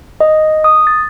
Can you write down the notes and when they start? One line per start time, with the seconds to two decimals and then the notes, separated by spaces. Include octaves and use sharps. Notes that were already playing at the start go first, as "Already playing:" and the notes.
0.20 D#5
0.64 D#6
0.87 A6